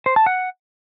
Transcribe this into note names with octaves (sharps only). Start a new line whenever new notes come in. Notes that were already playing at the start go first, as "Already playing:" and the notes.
C5
A5
F#5